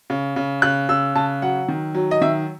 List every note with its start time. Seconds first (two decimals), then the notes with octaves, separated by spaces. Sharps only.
0.10 C#3
0.36 C#3
0.62 C#3 F#6
0.89 C#3 E6
1.15 C#3 A5
1.42 F#3 F#5
1.68 D#3
1.95 F#3
2.11 D#5
2.21 D#3 E5